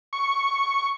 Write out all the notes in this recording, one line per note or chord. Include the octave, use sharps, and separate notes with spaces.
C#6